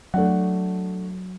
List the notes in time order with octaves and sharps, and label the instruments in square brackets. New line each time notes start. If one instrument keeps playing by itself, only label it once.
[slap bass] F#3 [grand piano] A3 D4 F#5